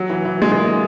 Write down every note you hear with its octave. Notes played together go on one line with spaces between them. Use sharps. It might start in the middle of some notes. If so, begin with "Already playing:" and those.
Already playing: F#3
E3
E3
G#3
G#3
A#3